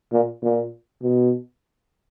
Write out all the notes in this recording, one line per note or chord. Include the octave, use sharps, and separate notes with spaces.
A#2
A#2
B2